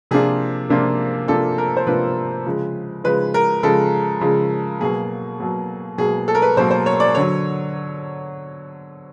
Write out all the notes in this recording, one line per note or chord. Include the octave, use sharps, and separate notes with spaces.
C3 F3 A#3 D4 F4 G#4
C3 F3 A#3 D4 F4
C3 F3 A#3 D4 F4 A4
A#4
C5
C3 F3 A#3 D4 F4 B4
C#3 F3 G#3
C#3 F3 G#3 B4
A#4
C#3 F3 G#3 A4
C#3 F3 G#3
B2 F#3 A#3 G#4
B2 F#3 A#3
B2 F#3 A#3 G#4
A4
A#4
B4
B2 F#3 A#3 C5
C5
C#5
D5
D3 F#3 C#5